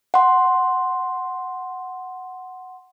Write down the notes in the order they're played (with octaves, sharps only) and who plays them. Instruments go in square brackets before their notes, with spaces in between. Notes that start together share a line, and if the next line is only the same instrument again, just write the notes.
[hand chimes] F#5 C6